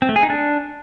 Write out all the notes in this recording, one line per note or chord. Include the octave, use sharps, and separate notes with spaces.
C4
A3
G#4
D#4
D4